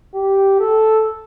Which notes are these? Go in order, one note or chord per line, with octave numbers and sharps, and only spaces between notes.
G4
A4